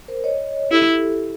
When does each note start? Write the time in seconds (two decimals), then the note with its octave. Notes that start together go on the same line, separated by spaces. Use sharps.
0.08 A#4 C5
0.24 C#5 D#5
0.71 E4 G4 A4